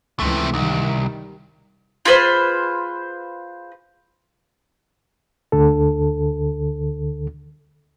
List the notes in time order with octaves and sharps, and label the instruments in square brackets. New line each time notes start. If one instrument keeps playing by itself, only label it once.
[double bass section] C#2 E3 [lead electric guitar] C3 A3
[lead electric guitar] C2 [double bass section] D#3 G3
[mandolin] F4 G#4 B4 C5
[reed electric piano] D2 D3 A4